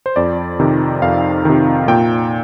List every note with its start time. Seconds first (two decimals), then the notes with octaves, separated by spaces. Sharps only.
0.06 C5
0.16 F2 D5
0.60 C3 D#3
1.02 F2 F5
1.45 C3 D#3
1.88 A#2 G5